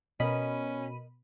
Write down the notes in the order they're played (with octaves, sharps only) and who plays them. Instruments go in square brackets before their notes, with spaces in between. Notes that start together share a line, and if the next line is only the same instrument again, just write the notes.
[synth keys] B2 B5 D#7 [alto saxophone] C#4 [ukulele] A#4 D#5